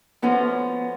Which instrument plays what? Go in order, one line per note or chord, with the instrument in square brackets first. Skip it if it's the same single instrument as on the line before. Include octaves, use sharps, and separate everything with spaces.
[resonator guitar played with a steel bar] F3 A3 C#4 F#4 [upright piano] B3